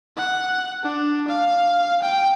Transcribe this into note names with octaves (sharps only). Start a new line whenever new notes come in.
F#5
D4
F5
G5